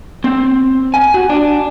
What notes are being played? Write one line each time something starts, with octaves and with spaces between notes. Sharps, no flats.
C4
G#5
F#4
D4